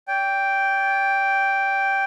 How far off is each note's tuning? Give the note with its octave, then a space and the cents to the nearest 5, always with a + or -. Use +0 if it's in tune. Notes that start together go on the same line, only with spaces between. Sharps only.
D5 -40 G5 +0